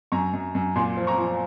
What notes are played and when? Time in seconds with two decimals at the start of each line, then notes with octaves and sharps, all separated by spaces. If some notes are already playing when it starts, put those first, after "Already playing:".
0.12 F#2 A#5 C#6
0.33 F#2
0.55 F#2
0.76 A#2 G#5 C6
0.97 F3
1.07 A#5 C#6
1.18 F3